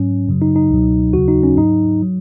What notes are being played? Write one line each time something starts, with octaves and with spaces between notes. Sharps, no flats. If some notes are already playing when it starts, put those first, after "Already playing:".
Already playing: G#2 F#3 C#4
F#2 C#3 F#3
D#4
D#4
C#2 B2 F#3
D#2 C#3 F#3 F#4
D#4
C#4
G#2 F#3 D#4
F#3